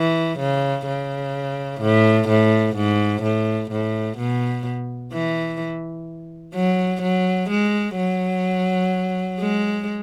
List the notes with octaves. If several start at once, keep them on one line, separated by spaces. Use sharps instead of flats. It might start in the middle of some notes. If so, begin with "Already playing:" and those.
Already playing: E3
C#3
C#3
A2
A2
G#2
A2
A2
B2
E3
F#3
F#3
G#3
F#3
G#3